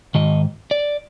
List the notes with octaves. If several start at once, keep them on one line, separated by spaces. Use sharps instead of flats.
G#2 D#3 D#5
D5